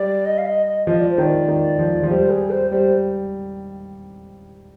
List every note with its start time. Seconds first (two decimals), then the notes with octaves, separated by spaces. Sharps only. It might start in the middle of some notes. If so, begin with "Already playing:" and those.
Already playing: G3 D5
0.26 D#5
0.38 F5
0.46 D#5
0.66 D#5
0.87 F3 D#5
0.99 D5
1.11 C5
1.18 D#3 D5
1.48 D#3
1.79 F3
2.03 F3
2.10 G3 C5
2.30 G#4
2.50 C5
2.71 G3 C5